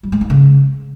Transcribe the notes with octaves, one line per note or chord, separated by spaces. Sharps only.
G3
G#3
D#4
C#3